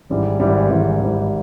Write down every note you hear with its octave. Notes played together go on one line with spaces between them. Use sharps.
G#1 G#2 E3 G3
G#1 G#2 E3 G3
G#1 G#2 E3 G3
G#1 G#2 E3 G3